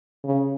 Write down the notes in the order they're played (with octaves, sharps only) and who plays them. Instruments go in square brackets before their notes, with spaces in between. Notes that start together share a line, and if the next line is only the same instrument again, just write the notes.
[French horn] C#3